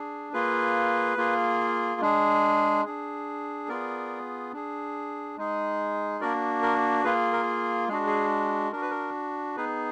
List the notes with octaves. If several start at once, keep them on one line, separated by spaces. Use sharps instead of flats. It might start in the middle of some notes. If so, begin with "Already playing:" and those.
Already playing: D4 G#4
A#3 F4 G#4 B4
A#3 F4 G#4
G#3 D4 G#4
D4 G#4
B3 F4 G#4 A#4 D5
D4 G#4
G#3 D#4 G#4
A#3 D4 F#4 A#4 D5
A#4
A#3 F4 G#4 B4
A#4
G#3 D4 F#4 G#4
G#4
D4 F#4 A#4
B4
A#4
B3 D#4 G#4 B4